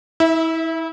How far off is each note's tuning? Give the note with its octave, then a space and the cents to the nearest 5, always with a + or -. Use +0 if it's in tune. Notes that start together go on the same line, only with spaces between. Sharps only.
E4 -30 E5 +0